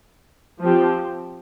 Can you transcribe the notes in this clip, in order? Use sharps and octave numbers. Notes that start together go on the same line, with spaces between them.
F3 C4 G4